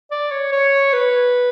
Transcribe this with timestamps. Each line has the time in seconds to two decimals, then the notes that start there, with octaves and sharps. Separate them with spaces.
0.11 D5
0.31 C#5
0.52 C#5
0.93 B4